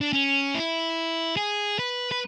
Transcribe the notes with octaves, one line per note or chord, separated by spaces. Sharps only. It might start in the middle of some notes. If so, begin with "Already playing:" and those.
D4
C#4
E4
G#4
B4
B4